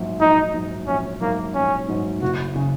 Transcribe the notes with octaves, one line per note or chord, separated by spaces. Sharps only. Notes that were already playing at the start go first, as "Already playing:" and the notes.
Already playing: A#1 G#2 F#3
A#1 D#4
G#2 F#3
A#1 C#4
G#2 F#3 A#3
A#1 C#4
G#2 F#3
F#1 F#4
C#3